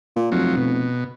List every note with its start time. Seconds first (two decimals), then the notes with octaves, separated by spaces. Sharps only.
0.16 A#2
0.32 F1 F3 F#3
0.57 B2